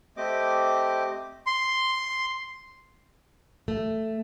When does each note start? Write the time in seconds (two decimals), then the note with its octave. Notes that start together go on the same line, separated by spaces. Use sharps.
0.17 A3 C4 G4 D#5 D6
1.47 C6
3.68 A3